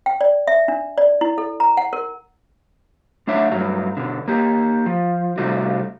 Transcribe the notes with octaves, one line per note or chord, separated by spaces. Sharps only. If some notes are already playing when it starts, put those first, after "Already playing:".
G5
D5
E5
D4
D5
E4
A4
A#5
F#5
A#4
A3 D4 C#5 E5
G2 F#3 A3
B2 D3
A#3 G4
F3
C3 G3 A3 F#4